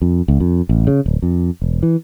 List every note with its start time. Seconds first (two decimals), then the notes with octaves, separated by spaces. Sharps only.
0.02 F2
0.28 C#2
0.40 F2
0.69 A1
0.87 C#3
1.06 D1
1.22 F2
1.62 E1
1.83 E3